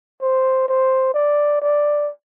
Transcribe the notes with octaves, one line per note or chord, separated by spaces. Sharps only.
C5
C5
D5
D5